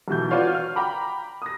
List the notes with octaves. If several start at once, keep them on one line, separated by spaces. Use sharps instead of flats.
B1 B2 E3 G6
F4 F#4 B4 C#5 D5 F5
F6
G5 A#5 B5 D6
D#6 A#6